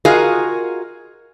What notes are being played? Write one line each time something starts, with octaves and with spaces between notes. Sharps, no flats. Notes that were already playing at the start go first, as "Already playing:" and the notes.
F4 F#4 G#4 A#4 D#5 F5